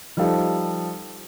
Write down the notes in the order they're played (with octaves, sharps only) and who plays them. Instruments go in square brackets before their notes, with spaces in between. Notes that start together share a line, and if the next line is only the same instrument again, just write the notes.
[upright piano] F3 G3 D#4 A4 F5